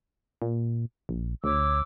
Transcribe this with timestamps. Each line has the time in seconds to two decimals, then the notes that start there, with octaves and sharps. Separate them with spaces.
0.42 A#2
1.09 A#1
1.44 D2 C#5 D6 E6